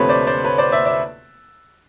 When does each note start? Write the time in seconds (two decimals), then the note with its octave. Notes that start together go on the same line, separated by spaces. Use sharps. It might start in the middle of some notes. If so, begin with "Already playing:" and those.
Already playing: D2 C3 F3 A3 C4 B4 C#5
0.08 C5 D5
0.27 C5 D5
0.44 B4 C#5
0.58 C5 D5
0.72 D5 E5
0.85 D5 E5